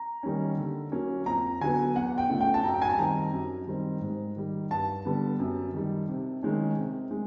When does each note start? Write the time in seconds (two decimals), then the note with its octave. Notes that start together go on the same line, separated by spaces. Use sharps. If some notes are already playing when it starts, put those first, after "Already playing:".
Already playing: A#5
0.23 D#3 G3 A#3 C#4
0.57 D3
0.92 F#3 A#3 C#4
1.26 F2 A#5
1.61 D3 F#3 B3 G#5
1.95 E2 F#5
2.18 G5
2.29 C#3 F3 A3 C#4
2.41 G5
2.54 A5
2.64 F#2 A#5
2.74 G5
2.82 G#5
2.89 A5
2.98 D#3 G3 C4 A#5
3.32 F#2
3.67 D#3 G3 C4
4.01 G#2
4.36 D#3 G3
4.70 G2 A5
5.05 D3 G3 B3
5.39 F#2
5.74 D#3 G3
6.09 C3
6.43 D#3 G#3 C#4
6.76 C3
7.11 G#3